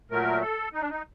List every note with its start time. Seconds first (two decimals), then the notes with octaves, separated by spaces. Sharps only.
0.10 A#2 F#3 A3 A#4
0.41 A4
0.73 D#4
0.81 D4
0.90 D#4